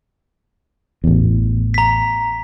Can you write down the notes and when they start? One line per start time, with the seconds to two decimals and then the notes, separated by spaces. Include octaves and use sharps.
1.04 A1 E2
1.74 A#5 B6